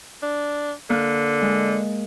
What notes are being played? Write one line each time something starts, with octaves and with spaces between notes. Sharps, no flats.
D4
D3 A#3 F#6
G#3